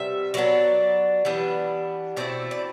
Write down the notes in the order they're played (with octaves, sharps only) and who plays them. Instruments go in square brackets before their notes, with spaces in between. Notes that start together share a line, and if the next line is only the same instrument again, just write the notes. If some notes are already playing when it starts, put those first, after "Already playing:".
Already playing: [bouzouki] C3 G3 B3 E5
F#3 B3 D4 D5
E3 G3 B3 D4
B2 A3 C4 E4 D5
D5